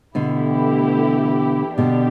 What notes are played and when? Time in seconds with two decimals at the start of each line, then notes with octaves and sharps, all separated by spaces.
0.15 B2 D3 E3 A3 E4 G4
1.78 B2 D3 B3 D4 G4